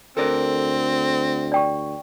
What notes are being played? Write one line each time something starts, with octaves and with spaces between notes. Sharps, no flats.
D2 C4 A4 A#4 D5
D5 G5 C#6